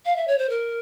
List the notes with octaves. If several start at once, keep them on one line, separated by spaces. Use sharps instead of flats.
F5
E5
C#5
C5
A#4